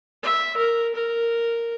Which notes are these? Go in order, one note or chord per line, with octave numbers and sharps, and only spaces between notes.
E5
A#4
A#4